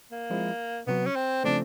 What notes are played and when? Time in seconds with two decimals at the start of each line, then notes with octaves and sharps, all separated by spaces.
0.11 A#3
0.30 F3 G#3 C4 E4
0.87 C3 D#3 F#3 B3
1.06 C#4
1.16 C4
1.44 C#3 F3 A3 C4 D4